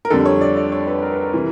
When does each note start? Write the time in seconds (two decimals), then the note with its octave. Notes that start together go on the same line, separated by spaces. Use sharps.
0.05 A#4
0.10 F2 D3 G3 A4
0.26 C#5
0.41 D5
0.57 D5
0.72 C#5
0.87 B4
1.02 A#4
1.12 B4
1.21 A#4
1.33 C3 E3 G3